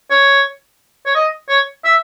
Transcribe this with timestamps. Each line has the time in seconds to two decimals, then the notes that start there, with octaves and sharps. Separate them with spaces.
0.11 C#5
1.06 C#5
1.15 D#5
1.49 C#5
1.84 E5